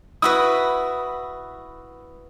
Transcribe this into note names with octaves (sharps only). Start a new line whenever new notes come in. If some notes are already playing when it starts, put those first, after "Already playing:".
E4 F#4 B4 D#6 E6